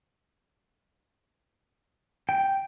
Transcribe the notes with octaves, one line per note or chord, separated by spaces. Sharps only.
G5